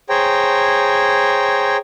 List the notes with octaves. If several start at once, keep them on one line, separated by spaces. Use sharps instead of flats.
G#4 C5 C#5 G5 A#5